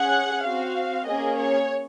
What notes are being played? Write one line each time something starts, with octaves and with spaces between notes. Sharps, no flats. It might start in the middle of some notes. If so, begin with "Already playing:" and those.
Already playing: C#4 G#4 F#5
C4 F#4 F5
A#3 C#4 G#4 D#5
C#5